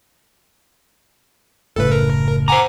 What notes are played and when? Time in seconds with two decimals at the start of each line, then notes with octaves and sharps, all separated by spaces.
1.76 F#1 A2 C#3 A4 B4
1.92 A#4
2.48 C5 F#5 G#5 A#5 D6